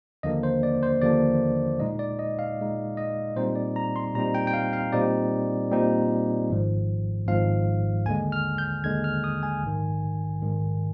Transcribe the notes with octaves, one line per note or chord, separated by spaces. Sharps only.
D#2 D3 F3 A#3 D4 D#5
C5
D5
C5
D#2 D3 F3 A#3 D4 D5
A#2 G#3 D#4 D#5
D5
D#5
F5
A#2 G#3 D#4
D#5
A#2 G3 C4 D#4 C5
D5
A#5
C6
A#2 G3 C4 D#4 A#5
G5
G5
F5
F5
A#2 G3 C4 D#4 D5
A#2 G3 C4 D#4
G#1 G#2 F3
G#1 G#2 F3 F5
D#2 D3 G#3 G#5
F6
G6
D#2 D3 G#3 G#6
F6
D#6
G#5
A#1 G#2 D#3
A#1 G#2 D#3